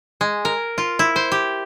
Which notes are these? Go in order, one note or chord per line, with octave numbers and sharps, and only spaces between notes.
G#3
A#4
F4
E4
C5
G4